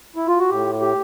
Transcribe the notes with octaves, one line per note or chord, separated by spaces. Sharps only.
E4
F4
F#4
A2 G4
G4